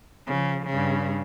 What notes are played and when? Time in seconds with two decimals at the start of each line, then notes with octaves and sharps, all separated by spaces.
0.27 C#3 F3
0.67 G2 C#3